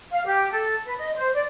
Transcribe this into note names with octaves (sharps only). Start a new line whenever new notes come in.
F5
G4
A4
B4
D#5
C5
D5